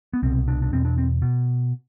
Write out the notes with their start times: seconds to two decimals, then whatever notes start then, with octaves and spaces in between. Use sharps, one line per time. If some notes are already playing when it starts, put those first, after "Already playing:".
0.13 B3
0.23 C2 B2 C4
0.48 D4
0.62 D4
0.72 E2 B2 C4
0.85 D4
0.98 C4
1.22 B2